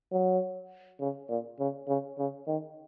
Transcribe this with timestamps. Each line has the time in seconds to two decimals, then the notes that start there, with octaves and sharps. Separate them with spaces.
0.12 F#3
1.00 C#3
1.29 A#2
1.59 C#3
1.88 C#3
2.18 C#3
2.47 D#3